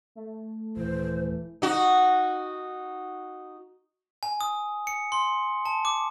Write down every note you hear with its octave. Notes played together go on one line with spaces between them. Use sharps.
A3
D#1 E3 C5
D#4 F#4
G#5
D#6
C#7
C6
A5
D6